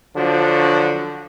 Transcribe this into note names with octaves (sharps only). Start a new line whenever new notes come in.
D3 F3 F#3 D4 F#4